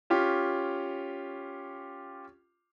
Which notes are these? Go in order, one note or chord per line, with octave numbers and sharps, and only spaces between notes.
C#4 F4 G4